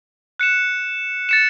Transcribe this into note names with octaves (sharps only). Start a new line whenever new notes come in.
F#6 C#7 E7
A6 C#7 E7